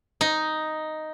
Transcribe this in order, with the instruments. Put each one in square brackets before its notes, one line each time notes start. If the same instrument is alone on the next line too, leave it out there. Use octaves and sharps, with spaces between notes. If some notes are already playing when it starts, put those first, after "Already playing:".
[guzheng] D#4